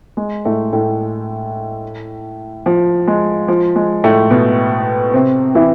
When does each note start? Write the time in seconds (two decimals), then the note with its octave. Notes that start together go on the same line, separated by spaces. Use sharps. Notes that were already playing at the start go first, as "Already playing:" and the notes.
0.17 G#3
0.45 A2 A3
0.73 A2 A3
2.66 F3
3.07 G#3
3.48 F3
3.76 G#3
4.04 A2 A3
4.30 B2 B3
5.14 C3 C4
5.55 E3 E4